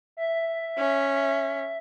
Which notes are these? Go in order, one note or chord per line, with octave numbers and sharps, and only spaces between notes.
E5
C#4